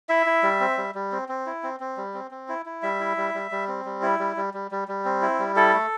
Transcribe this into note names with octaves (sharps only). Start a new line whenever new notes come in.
E4 E5
E4
G3
C4
G3
G3
C4
C4
E4
C4
C4
G3
C4
C4
E4
E4
G3 E5
E4
G3
G3
G3
C4
G3
E4
G3
G3
G3
G3
G3
C4
E4
G3
E4 A4
A3